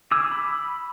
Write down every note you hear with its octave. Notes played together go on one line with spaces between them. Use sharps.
G#4 D6 E6
B5